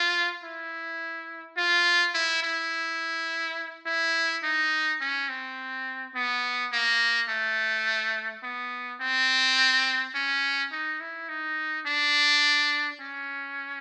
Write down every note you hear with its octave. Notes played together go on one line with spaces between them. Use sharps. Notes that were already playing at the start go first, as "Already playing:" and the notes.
Already playing: F4
E4
F4
E4
E4
E4
D#4
C#4
C4
B3
A#3
A3
B3
C4
C#4
D#4
E4
D#4
D4
C#4